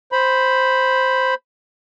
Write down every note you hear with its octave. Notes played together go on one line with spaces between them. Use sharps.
C5 B5